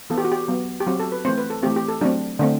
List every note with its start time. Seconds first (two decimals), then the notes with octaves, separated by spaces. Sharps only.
0.10 E3 B3 A4
0.18 G4
0.24 F#4
0.32 G4
0.48 F#3 B3
0.80 G4
0.87 F#3 C4 F#4
1.00 A4
1.12 B4
1.25 E3 A3 C4 C5
1.37 B4
1.50 A4
1.63 E3 A3 C4 G4
1.76 G4
1.89 A4
2.01 F#3 A3 C4 D4
2.39 D3 A3 C4 D4